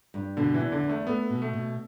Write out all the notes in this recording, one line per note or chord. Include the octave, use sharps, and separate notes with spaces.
G2
B2 D3
E3
E2
D3
E2
A3
A3 B3
B2
A3
B2